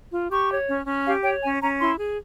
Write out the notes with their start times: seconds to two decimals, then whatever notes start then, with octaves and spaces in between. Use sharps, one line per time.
0.12 F4
0.30 G4 C#6
0.50 C#5
0.68 C#4
0.87 C#4
1.05 G4 F5
1.23 C#5 G5
1.43 C#4 G#5
1.61 C#4 A#5
1.79 E4 C6
1.98 G#4